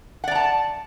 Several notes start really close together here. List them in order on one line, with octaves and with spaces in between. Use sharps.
F#5 D5 A#5 A5